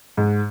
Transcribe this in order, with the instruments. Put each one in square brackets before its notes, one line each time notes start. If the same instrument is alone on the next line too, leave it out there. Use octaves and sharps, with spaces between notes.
[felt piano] G#2